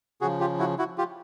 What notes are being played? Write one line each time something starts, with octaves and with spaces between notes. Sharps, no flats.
C#3 F3 F#4 G#4
F4 G4
E4 F#4
E4 F#4
F4 G4